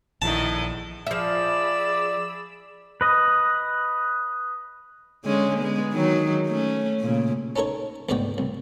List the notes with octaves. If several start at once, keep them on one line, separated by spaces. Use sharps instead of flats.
A#1 E2 A2 D#3 E4 D#5 A5
F3 G#4 D5 E5 B5 E6
B4 D#5
D3 G#3 C#4
G#3 B3
D#3 F#3 D#4
A3 C#4
A#2 C#3
C#4 D#4 A4 A#4 C#5
D2 G#2 B2 D5 D#5 G5
C2